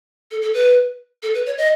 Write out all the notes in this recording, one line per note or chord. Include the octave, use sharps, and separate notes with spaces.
A4
A4
B4
A4
B4
C#5
D#5